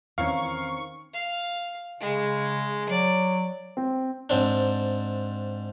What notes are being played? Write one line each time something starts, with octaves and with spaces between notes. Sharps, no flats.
E2 D#3 E3 C4 C#4 C#5 F5 C#6
F5
C#3 G#3
F#3 D5
C4
G#2 C4 D4